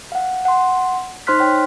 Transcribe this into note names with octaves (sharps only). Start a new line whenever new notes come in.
F5 F#5
F#5 C6
D#4 C5 C6 F6 F#6 B6
C#5 G5